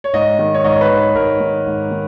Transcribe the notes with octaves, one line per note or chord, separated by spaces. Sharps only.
C#5
G#2 D#5
D#3
C#5
G#2 D#5
C#5
B4
D#3
B4
G#2 A#4
D#3
G#2
D#3